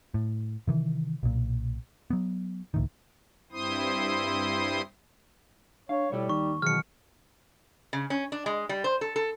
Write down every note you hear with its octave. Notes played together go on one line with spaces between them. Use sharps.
A2
C3 D#3 E3
B1 A#2
F#3 B3
C#2 A2 D#3
G2 C4 E4 C5 C6 D#6
D4 C#5 F5
B2 G3 E4 A4 C#5
D#2 D#4 C#6
B2 D#3 E3 F#3 G#4 F6 C#7
C#3
C#4
D4
G#3
G3
C5
A4
A4